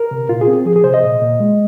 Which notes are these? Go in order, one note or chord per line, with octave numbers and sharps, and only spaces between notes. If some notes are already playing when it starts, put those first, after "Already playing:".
Already playing: A#4
C3
A#2 F4
G#4
C4
F3 G#4
G#4
C3 C5
D#5
A#2
A#2
G#3